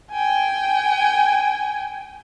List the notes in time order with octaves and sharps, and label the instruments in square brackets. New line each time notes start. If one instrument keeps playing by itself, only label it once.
[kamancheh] G5 G#5